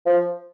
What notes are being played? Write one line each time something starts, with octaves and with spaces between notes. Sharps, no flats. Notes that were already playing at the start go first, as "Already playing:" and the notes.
F3